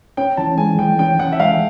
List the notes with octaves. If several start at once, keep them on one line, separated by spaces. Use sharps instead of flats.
C#4 G5
E3 A5
G#3 G#5
E3 G5
C#4 G5
E3 F#5
E5
G#3 F5